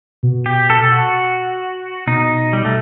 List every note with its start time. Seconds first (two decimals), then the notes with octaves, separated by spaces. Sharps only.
0.23 B2
0.46 G4
0.70 A4
0.92 F#4
2.07 B2 D#4
2.53 G3
2.65 A3